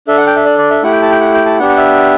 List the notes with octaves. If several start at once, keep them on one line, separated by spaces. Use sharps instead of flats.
D4 A4 E5
F#5
G5
E5
D5
D5
E5
A3 E4 G4 F#5
G5
A5
G5
F#5
G5
A5
B3 D4 G4 F#5
F#5
E5